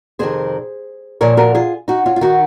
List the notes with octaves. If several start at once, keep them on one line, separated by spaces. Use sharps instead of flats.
F2 C3 D#3 G#4 C5
A#2 F3 A#4 C#5
F#4 A#4
F4 G#4
D#4 F#4
C#4 F4
F4
D#3 D#4 F#4